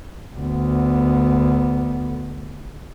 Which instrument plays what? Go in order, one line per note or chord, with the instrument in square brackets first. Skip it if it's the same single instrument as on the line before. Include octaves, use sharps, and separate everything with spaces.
[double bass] D2 B3